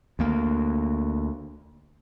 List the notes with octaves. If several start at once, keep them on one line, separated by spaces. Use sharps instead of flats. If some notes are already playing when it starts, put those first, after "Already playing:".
D2 A#3